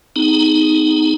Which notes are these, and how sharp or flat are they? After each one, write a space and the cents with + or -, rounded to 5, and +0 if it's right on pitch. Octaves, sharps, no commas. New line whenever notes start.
B3 +40 D#4 +0 G#4 +0